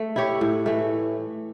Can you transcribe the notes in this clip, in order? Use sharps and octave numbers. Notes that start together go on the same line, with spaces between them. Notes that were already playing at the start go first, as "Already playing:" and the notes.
Already playing: A3
E4 G4 C#5
A2
E3 A3